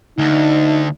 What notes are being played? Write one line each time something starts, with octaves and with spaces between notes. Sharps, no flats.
D2 D#4